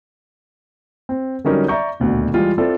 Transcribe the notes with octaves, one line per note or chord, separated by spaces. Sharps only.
C4
D3 F#3 G3 C#4 D#4 A#4
D5 E5 A#5 C#6 G6
D#1 D2 B2 F#4 F#5
E3 G3 G#3 F4
C4 E4 F4 A4 D5